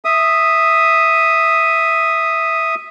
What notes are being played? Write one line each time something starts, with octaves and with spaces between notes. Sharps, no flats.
E5 D#6